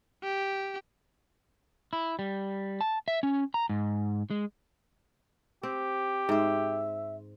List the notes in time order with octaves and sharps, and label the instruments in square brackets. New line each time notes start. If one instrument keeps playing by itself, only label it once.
[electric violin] G4
[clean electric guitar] E4
G3
A5
E5
C#4
A#5
G#2
G#3
[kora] C4 [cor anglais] G4
[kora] G#2 C5 [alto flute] E5